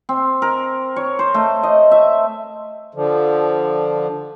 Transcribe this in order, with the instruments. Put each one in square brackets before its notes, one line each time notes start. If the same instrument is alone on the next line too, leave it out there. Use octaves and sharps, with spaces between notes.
[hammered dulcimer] C4
A#4
C#5
C5
A3
D#5
E5
[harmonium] D3 F3